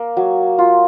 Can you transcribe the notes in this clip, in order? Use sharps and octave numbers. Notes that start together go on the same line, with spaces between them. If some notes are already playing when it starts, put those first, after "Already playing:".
Already playing: A#3
F#3
F4